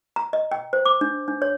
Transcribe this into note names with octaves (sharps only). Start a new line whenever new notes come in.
A#5
D#5
G5
C5
D6
D4
D4
C#5